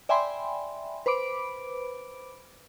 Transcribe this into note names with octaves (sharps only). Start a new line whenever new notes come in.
D5 E5 G5 G#5 B5 C6
B4 C5 B5 D6 D7